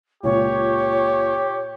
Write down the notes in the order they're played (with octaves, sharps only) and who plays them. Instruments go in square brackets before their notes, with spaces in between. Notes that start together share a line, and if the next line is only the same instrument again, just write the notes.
[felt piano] C#2 A#2 [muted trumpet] G4 [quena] C#5